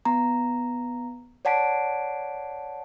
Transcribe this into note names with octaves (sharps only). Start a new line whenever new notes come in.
B3 A#5
C#5 D5 F#5 A5 B6 D7